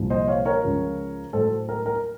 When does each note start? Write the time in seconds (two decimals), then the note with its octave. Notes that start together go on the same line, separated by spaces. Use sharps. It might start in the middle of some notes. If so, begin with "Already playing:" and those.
Already playing: C2 A#2 F3
0.10 C5 D#5
0.28 C#5 F5
0.45 A#4 C#5
0.63 C#2 C#3 F3
1.33 A2 F#3 A4 C5
1.69 A#4
1.86 A#4